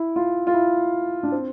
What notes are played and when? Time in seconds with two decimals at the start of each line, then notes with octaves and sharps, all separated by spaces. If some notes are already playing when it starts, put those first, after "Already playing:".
Already playing: E4
0.16 F4
0.47 F4
0.54 E4
1.23 D4
1.32 C4